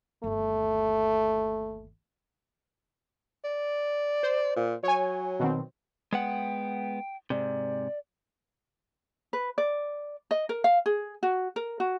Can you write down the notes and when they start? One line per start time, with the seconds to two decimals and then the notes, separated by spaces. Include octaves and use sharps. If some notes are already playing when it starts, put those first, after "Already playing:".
0.24 G1 D#2 A3
3.44 D5
4.23 C5
4.56 A#2
4.83 F#3 C#5 G#5
5.40 B2 D#3 C4
6.13 G#3 B3 F#5 G5
7.30 G#2 C3 D5
9.33 B4
9.58 D5
10.31 D#5
10.49 A#4
10.64 F5
10.86 G#4
11.23 F#4
11.56 A#4
11.80 F#4